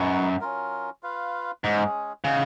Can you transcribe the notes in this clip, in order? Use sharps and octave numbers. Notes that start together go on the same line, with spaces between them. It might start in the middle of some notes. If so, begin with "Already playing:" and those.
Already playing: F#2 G#3 D#4 F#4 B4
F#3 C#4 F4 A#4
F4 B4 F5
G#2 G#3 C#4 G#4
C#3 C#4 G#4 D#5 F#5